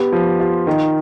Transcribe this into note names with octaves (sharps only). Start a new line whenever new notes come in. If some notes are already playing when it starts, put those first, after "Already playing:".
Already playing: B3 G4
F3
F4
D#3